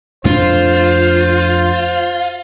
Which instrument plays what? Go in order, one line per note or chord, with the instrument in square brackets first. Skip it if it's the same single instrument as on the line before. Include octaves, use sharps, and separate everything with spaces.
[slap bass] F2 A3 D4 [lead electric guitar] F4 [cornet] C5